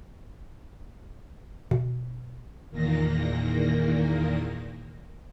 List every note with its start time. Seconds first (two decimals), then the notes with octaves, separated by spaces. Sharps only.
1.71 B2
2.71 E2 A#2 D#3 A#3 A#6